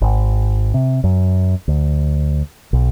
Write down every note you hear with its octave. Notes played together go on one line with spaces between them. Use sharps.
G#1
C3
F#2
D2
B1